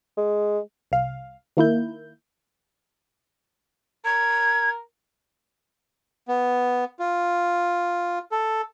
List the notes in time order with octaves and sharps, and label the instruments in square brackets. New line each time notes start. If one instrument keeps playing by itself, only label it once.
[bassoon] G#3
[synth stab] C2 F5
D#3 A#3 E4 G6
[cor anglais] A#4 [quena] G#6
[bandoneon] B3
F4
A4